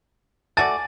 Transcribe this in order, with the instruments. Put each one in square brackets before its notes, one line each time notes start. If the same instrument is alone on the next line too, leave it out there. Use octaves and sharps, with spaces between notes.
[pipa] A3 F#4 D5 [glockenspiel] G#5 A5 [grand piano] A6